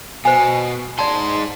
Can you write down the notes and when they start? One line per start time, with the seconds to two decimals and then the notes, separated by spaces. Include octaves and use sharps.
0.25 B2 C5 G#5
0.99 G#2 D5 A5 C6